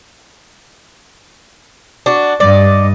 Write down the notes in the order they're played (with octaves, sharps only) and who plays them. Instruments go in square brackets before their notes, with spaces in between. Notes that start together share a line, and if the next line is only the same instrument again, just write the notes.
[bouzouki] D4 F#4
[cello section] G2 D#5 [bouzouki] D5